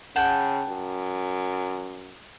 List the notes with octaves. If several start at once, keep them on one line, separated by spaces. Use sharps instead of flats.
C#3 F#5 G5 A5
F#2